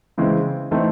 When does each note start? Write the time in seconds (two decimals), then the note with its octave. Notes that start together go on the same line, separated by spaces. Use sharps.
0.18 C#3 E3 G#3 C4
0.71 E3 A3 C4 D#4